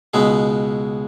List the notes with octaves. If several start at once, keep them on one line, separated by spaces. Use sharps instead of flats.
C#2 B2 G#3 B3 G#4